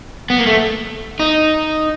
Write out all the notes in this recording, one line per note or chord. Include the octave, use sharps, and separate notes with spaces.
B3
A#3
A3
D#4